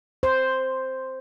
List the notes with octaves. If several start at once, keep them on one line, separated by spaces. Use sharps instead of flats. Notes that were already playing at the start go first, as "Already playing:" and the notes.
C5